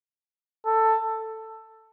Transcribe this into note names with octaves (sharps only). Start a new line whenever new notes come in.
A4